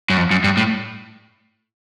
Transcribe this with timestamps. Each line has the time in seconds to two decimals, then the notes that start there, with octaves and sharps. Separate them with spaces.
0.10 F#2
0.17 F2
0.31 F#2
0.44 G2
0.57 A2